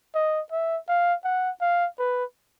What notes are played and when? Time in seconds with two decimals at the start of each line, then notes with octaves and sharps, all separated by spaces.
0.15 D#5
0.52 E5
0.88 F5
1.24 F#5
1.61 F5
1.99 B4